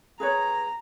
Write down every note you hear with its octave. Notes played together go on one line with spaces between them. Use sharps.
G#4 B4 C#5 A#5